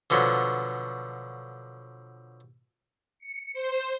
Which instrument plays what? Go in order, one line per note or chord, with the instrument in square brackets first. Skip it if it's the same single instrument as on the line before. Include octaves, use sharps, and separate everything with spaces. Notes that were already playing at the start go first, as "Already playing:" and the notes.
[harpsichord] B2 D3 F3 F#3
[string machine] C#7
C5